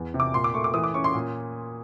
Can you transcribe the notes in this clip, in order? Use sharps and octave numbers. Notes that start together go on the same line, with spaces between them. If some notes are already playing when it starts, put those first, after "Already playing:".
Already playing: E2
C3
D6
A#2 C6
D6
A3 C#6
D6
E3 D#6
D6
C#4 C#6
C6
A#2